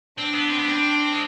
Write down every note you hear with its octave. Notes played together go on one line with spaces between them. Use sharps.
C4 D4
B3
C4
B3
C4
G#3